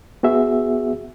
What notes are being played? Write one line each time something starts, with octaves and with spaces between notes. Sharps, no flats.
B3 F#4 G#4 E5